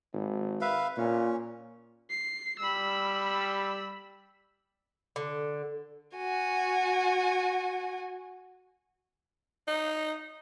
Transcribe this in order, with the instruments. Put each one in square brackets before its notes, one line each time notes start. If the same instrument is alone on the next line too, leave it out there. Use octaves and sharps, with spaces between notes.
[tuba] G#1
[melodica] B4 E5 F5
[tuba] A#2 [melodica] C#4
[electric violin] C7
[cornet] G3 [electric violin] B5 E6
[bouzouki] D3
[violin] F#4 G#5
[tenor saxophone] D#4